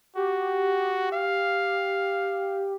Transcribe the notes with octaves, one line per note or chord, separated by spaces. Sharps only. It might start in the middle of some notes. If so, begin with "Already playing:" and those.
F#4 G4
F5